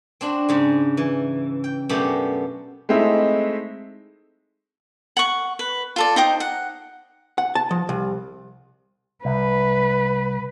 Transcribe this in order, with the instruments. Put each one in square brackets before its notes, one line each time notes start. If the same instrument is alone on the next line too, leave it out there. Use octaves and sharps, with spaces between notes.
[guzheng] C4 D4 F#4
G#2 C#3
E3
G5
F#2 B2 A3 F#4 G4 D5
[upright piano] G#3 A3 C4 D#4 E4
[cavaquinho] F#5 C#6
B4
F4 A4 D5
D#4 C5 G5 D#6
F#5
[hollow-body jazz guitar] F#5
A5
F3
C2
[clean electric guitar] C2 [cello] B4